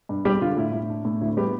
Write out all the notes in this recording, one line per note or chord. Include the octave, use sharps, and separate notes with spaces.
G2
G3 G4
D3 F4
A2 E4
A2
D4
A2
D2 E4
G3 B3 G4